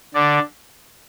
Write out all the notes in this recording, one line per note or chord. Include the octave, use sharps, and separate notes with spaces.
D3 D5